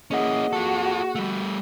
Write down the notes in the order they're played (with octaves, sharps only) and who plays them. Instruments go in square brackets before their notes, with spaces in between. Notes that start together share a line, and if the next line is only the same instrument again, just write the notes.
[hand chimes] A#3 G#4 F#5 [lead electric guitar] C#4 E4 [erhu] D#5
[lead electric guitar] F4 A4 [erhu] F#4
[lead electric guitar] G3 A3